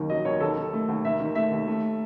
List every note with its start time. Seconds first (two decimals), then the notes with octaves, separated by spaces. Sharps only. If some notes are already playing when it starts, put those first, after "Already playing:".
Already playing: F#1 D#2 D#3
0.10 F#3 D#5
0.25 D#2 C#5
0.40 D#2 A4
0.56 D#3
0.73 A3
0.88 D#2
1.04 D#2 E5
1.20 D#3
1.35 A3 E5
1.51 D#2
1.67 A3